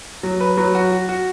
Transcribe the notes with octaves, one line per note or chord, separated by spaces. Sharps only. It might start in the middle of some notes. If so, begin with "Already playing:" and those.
F#3
B4
F#3
F#4
F#4
F#4